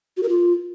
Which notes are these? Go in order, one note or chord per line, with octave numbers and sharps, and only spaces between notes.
F#4
A#4
F4